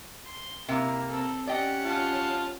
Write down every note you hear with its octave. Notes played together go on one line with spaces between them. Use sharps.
C6
C3 A#3 E4 F5 A#5
C4 A4
C#4 G4 D5 D#5 F#5 G5
F4 A5